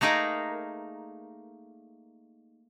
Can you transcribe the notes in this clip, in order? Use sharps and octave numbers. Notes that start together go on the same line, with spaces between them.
A3 A#3 D#4 G#4 A#4